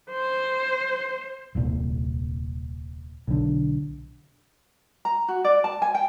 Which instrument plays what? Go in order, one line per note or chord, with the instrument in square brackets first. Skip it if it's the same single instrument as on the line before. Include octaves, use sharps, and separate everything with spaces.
[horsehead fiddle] C5
[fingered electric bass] D#1 C2 A#2
B1 D3
[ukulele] A#5
F#4
D5
A5
G#5
G5